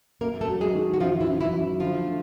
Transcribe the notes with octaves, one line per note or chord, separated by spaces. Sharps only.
F#2 A#3 A#4
A3 A4
F#3
G#3 G#4
D#3
F#4
F#2 F3 F4
E3 E4
F#2
E3 E4
F#3
D3 F3 F4
A3